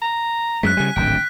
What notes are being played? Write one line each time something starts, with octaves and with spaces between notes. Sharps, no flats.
A#5
F#2 G#3 F#6 B6
C#3 G3 G#5
D1 G#1 D3 G5